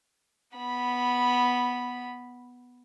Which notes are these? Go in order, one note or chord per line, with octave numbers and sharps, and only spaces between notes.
B3 B5